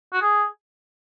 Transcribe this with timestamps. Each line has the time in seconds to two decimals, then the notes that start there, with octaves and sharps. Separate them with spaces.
0.13 F#4
0.22 G#4